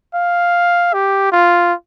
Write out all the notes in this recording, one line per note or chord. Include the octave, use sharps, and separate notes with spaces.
F5
G4
F4